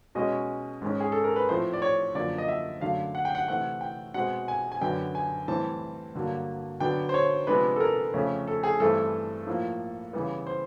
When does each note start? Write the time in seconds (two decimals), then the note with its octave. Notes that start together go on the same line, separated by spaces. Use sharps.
0.15 B2 G#3 C#4 D#5
0.82 G#2 D#3 G#3 C#4
1.00 G#4
1.12 A4
1.24 A#4
1.36 B4
1.49 A2 F3 A3 C4 C5
1.73 D5
1.82 C#5
2.15 F#2 D3 F3 A#3 D4 D5
2.38 D#5
2.48 E5
2.81 F#2 D3 F#3 A3 D4 F5
3.15 F#5
3.25 G5
3.35 F#5
3.48 C3 E3 A3 C4 F#5
3.81 G5
4.14 B2 G#3 C4 F#5
4.48 G#5
4.72 G#5
4.81 F#2 D3 F#3 B3 D4 G5
5.15 G#5
5.48 A2 E3 G3 C4 A5
6.14 G2 D3 F#3 A#3
6.80 D3 F#3 B3 D4 G5
7.09 C5
7.14 C#5
7.47 C3 F3 G#3 B3 D4 B4
7.76 A4
7.80 A#4
8.14 F2 C#3 F3 A3 C#4
8.48 A4
8.64 G#4
8.80 G2 E3 A3 C4 A4
9.47 A2 F3 A#3
10.13 C#3 E3 G3 B3
10.47 C5